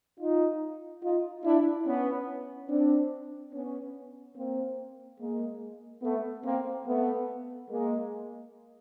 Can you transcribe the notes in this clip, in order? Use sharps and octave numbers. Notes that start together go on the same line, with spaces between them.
D#4 F4
D#4 F4
D4 E4
B3 C#4
C4 D4
B3 C#4
A#3 C4
G#3 A#3
A3 B3
A#3 C4
A3 B3
G#3 A#3